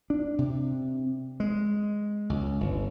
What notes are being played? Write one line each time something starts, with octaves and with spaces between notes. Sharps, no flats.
D4
C3
G#3
C#2
G1